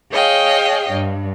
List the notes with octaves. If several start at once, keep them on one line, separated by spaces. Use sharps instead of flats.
G#4 C#5 D#5 F5 G5
G2